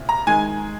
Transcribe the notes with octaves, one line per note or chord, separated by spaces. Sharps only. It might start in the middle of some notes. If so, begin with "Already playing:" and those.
Already playing: C2 A#2
A#5
D#3 G#3 G#5